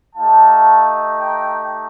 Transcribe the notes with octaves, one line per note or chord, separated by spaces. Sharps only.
A3 D#4 G4 F5 A5
G5 A#5